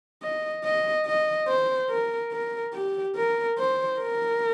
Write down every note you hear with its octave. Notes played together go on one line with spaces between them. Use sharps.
D#5
D#5
D#5
C5
A#4
A#4
G4
A#4
C5
A#4